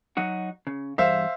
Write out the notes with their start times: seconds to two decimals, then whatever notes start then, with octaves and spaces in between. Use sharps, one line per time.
0.17 F#3 D#4 F#4
0.67 C#3
0.98 E2 G2 C5 E5 F5